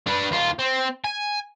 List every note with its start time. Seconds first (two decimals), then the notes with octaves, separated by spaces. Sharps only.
0.07 D4 B4
0.31 D#2 F4
0.59 C4
1.04 G#5